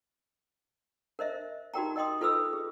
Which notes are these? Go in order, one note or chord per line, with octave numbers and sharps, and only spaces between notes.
A#4 C5 D#5 E5
D#4 F#4 G4 A#4 G5 A#5
A#4 D#5 G5 C6 D#6
F4 A4 B4 B5 D#6 E6
G#4